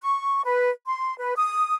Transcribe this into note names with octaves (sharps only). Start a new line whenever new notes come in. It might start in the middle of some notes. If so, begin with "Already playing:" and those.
C#6
B4
C6
B4
D#6